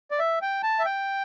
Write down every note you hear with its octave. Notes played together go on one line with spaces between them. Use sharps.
D5
E5
G5
A5
E5
G5